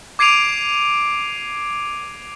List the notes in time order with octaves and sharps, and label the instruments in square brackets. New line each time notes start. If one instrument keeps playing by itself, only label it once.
[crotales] D6 G#6 C7 D7 D#7 F7